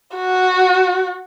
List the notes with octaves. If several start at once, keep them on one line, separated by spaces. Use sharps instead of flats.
F#4